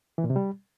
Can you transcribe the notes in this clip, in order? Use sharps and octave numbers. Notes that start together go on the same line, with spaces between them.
E3
A#2
C3
G3